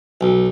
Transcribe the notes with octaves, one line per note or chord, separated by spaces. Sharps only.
B1